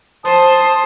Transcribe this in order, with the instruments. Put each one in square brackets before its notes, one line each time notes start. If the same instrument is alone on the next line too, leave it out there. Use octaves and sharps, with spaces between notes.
[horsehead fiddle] C5 [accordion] A5 D#6